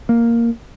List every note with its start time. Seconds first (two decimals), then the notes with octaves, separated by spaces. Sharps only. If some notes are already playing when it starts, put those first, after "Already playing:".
0.09 A#3